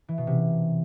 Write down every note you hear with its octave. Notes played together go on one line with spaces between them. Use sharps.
E3
B2
C3